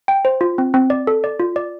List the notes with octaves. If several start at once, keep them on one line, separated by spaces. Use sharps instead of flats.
G5
C5
F4
C4
C4
D5
A4
D5
F4
D5